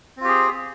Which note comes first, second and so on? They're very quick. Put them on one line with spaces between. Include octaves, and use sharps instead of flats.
C4 F4 G4 G#4